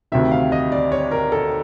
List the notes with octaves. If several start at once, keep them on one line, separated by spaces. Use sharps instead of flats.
D2 C3 D#3 E5
F5
D#5
D5
C#5
A#4
A4